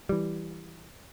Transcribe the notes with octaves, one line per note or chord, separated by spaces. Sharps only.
E3 G3